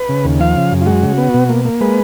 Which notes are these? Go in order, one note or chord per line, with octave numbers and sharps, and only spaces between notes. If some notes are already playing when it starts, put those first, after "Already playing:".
Already playing: B4
C#3
D#2
F3 F5
C#3
F#2
F4
G#3 F#4
C#3
B3
B2
A#3
A#3
G#3 B4